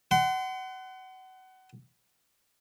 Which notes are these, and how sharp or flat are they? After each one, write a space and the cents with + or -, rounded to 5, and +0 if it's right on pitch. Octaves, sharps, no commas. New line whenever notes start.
F#5 +25 C6 -35